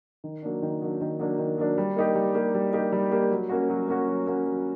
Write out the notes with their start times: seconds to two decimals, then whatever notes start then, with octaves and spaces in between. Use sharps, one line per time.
0.24 D#3
0.43 F#3 A#3 D4
0.62 D#3
0.82 F#3 A#3 D4
1.01 D#3
1.19 F#3 A#3 D4
1.39 D#3
1.58 F#3 A#3 D4
1.78 G3
1.96 A#3 D#4 G4
2.15 G3
2.35 A#3 D#4 G4
2.54 G3
2.73 A#3 D#4 G4
2.92 G3
3.12 A#3 D#4 G4
3.30 F#3
3.49 A#3 C#4 F#4
3.70 F#3
3.88 A#3 C#4 F#4
4.08 F#3
4.27 A#3 C#4 F#4
4.46 F#3